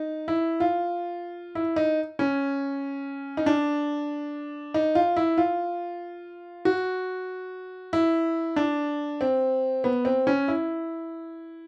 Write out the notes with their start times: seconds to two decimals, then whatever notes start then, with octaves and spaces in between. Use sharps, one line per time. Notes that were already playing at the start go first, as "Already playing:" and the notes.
Already playing: D#4
0.28 E4
0.60 F4
1.55 E4
1.76 D#4
2.19 C#4
3.37 D#4
3.46 D4
4.74 D#4
4.95 F4
5.17 E4
5.38 F4
6.65 F#4
7.93 E4
8.56 D4
9.21 C4
9.84 B3
10.05 C4
10.27 C#4
10.48 E4